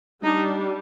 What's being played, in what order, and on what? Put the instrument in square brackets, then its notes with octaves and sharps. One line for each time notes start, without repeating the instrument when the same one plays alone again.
[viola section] G3 D4 D#4